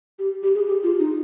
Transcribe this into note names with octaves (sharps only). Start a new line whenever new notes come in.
G4
G4
G#4
G4
F4
D#4